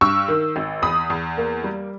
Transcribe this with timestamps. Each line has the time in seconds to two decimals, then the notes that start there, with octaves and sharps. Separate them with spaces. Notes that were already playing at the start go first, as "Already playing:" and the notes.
0.01 G2 C#6 E6
0.28 D#3
0.56 G#1
0.82 E2 B5 D#6
1.10 E2
1.37 A#3
1.64 G3